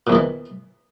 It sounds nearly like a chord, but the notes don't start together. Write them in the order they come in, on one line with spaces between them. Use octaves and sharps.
A#2 E2 D#3 E3